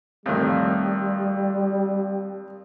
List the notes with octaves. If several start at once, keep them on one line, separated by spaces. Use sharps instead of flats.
F2 A2 D#3 G3